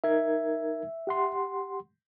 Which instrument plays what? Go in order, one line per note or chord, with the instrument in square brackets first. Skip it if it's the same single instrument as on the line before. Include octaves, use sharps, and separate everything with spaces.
[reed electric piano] D#4 A#4 G#6 [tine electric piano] E5
[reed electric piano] G4 F#5 C6